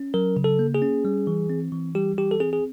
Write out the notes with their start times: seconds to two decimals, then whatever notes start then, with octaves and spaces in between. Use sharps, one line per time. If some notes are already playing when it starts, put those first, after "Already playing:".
Already playing: C#4
0.14 F#3 A#4
0.37 C#3
0.44 A4
0.59 A#3
0.74 G#4
0.82 C#4
1.05 G3
1.27 E3
1.50 C4
1.72 E3
1.95 G3 G4
2.18 E3 G4
2.31 A4
2.40 C4 G#4
2.53 G#4